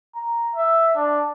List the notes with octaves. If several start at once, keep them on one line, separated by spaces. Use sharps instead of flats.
A#5
E5
D4